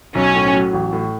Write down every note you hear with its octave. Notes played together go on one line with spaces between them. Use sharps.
B1 C#4
A2
F#3
A1
A2